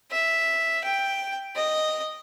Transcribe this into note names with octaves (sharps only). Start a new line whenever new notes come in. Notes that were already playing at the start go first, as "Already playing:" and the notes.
E5
G5
D#5